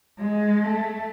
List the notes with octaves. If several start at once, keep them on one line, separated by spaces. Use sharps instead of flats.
G#3
A3